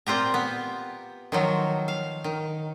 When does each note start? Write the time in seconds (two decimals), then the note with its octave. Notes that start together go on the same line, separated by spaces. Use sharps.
0.06 A#2 C4 F4 G4 A#5
0.34 B3
1.32 D#3 F3 F#3
1.88 F5
2.24 D#3